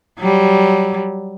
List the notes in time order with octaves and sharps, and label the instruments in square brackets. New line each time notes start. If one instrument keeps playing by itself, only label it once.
[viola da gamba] F#3 G3